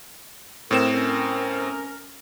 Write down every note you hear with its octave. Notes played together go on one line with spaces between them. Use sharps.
A2 C4 A#4 E7
C#4 A#4